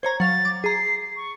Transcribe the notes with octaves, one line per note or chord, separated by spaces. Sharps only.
C5 C#5 A#5 G#6
F#3 F5 A6
D6
G#4 A#5 C7
C#6